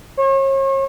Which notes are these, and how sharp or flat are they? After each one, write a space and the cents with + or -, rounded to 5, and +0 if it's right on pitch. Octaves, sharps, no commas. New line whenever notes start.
C#5 -40